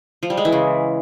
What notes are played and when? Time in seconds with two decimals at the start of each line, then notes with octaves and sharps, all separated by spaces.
0.23 F3
0.30 G3
0.37 G#3
0.45 E3
0.52 C#3